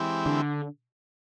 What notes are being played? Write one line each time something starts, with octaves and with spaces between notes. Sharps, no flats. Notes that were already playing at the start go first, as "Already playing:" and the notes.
Already playing: E3 G#3 C4 E4 G4
D3